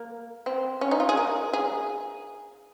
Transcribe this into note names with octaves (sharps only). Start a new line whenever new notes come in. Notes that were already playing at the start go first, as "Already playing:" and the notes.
Already playing: A#3
C4
C#4
D#4
F4
G#4
A#4
G#4